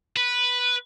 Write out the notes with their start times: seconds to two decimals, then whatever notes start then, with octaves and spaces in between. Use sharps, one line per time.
0.17 B4